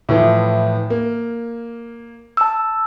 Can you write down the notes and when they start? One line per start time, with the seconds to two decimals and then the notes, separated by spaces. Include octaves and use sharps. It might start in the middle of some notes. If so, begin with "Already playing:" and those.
0.09 A2 E3 F3
0.90 A#3
2.37 A5 E6